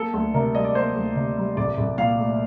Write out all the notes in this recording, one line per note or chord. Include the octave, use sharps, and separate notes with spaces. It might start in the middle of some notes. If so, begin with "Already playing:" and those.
Already playing: A#3 A4
D2
C3 A#4
G3 D#5
D5
A#3 C5
D2
C3
G3
C2 D5
C2
A#2 F5
A3